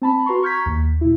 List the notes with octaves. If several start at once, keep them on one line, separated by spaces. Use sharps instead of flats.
C4 A5 B5
F#4 B4 A#5 C6 C#6
A#5 C#6 F6 G6 G#6 B6
D#2
A#2 E4